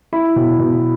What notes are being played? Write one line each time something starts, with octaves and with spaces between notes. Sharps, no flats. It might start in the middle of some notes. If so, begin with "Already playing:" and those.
E4 B5
B2
B2